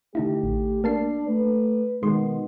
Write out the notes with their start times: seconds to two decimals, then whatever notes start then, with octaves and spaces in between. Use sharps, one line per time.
0.15 D3 A3 D#4 E4 G4
0.43 A1
0.84 A#3 D4 A5 C7
1.28 A3 B4
2.03 B2 D#3 G#3 C6